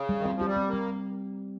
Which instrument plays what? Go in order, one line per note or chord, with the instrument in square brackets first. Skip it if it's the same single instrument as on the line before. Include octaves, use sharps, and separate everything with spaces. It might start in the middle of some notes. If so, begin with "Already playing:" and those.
Already playing: [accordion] C#3
[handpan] G3
[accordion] D#3
[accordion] F3 [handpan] C4
[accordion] F3
[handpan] G4
[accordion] G3
[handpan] C4
[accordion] A#3
[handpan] G3